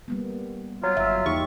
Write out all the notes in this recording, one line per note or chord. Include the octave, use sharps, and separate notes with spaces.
G3 A#3 B3
F#3 F4
G1 E5
E2 A#3 D#4 G4 C#6